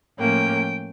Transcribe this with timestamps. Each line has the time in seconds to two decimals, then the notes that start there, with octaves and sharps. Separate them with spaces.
0.19 A2 F3 A#3 C#4 G5